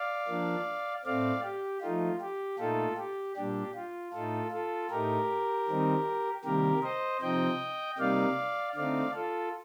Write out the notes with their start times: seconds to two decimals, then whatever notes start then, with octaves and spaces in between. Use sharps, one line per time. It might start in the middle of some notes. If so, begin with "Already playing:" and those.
Already playing: D5 F5
0.28 F3 A#3 D4
1.04 A2 A3 C4 D5 F5
1.43 G4
1.81 F3 A3 D#4 F4
2.21 G4
2.59 A#2 A3 D#4 F4 A4
2.97 G4
3.36 A#2 G3 D4 G4
3.75 F4
4.13 A2 A3 D#4 F4 A4
4.51 F4 A4
4.90 A2 A3 D#4 G4 A#4
5.68 D#3 G3 C4 D#4
6.44 C3 D#3 G3 A#3 G4 A#4
6.83 C5 D#5
7.21 C3 F3 C4 D#4 D#5 G5
7.98 C3 G3 A#3 D#4 D5 F5
8.75 D3 A3 C4 D#4 D5 F5
9.14 F4 A4